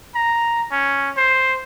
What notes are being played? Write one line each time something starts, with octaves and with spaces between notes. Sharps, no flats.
A#5
C#4
C5